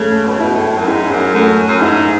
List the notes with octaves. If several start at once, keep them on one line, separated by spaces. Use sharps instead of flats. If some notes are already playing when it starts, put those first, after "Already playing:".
Already playing: C#3 A3
B2
C#3
B2 E4
A2
F#2
G#2 E4
F#2
F#2 A3
F#2
G#2 E4